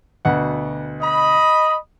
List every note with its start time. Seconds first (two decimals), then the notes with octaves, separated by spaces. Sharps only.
0.25 D2 B2 F#5
1.02 D#5 B5